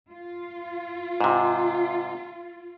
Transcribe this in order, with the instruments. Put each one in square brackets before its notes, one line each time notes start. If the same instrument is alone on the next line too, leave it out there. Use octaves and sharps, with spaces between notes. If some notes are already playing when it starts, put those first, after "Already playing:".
[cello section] F4
[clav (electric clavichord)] G#2 C3